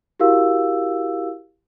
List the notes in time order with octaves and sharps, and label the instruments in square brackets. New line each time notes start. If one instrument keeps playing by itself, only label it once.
[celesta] E4 F#4 G4 A#4 F5 E6